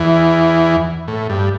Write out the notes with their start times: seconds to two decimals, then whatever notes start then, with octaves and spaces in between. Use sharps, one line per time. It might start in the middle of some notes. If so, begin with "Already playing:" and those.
Already playing: E2 E3
1.08 A2
1.30 G2